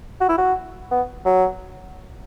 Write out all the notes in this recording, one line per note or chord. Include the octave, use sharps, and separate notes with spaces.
F#4
E4
F#4
B3
F#3